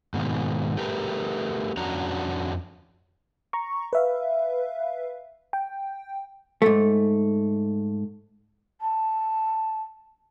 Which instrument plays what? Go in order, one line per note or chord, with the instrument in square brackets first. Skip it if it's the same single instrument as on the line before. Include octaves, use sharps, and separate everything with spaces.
[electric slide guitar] G#2 B2 D#3
A3 G4 A#4 B4
F2 C#4 D4 F#4 A#5
[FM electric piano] A#5 C#6
B4 E5 F5
G5
[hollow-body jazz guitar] G#2 A3
[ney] A5